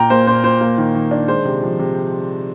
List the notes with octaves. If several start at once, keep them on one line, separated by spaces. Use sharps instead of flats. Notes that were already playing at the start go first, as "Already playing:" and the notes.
Already playing: A#2 G5 A#5
A#3 C5
A#2 C5
A#2 C5
A#3
D#3
D#3
D4
G#3 C5
C3
F3
C3